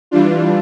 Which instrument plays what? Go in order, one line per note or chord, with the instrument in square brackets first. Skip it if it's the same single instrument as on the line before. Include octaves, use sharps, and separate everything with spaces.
[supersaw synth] E3 G3 D4 F4